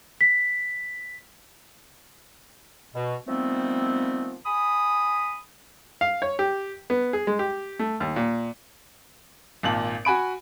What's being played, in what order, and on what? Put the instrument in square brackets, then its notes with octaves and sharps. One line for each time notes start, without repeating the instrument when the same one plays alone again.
[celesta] B6
[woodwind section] B2
D#3 F3 G3 A3 B3 C4
G#5 B5 D#6
[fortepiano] F5
C#5
G4
B3
G#4
G#3
G4
A3
D#2
A#2
[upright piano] G#1 A#2 A5 F#7
F#4 G#5 B5 D7